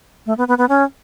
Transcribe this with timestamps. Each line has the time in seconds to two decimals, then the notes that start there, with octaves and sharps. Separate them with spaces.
0.26 A3
0.38 B3
0.48 B3
0.58 B3
0.69 C#4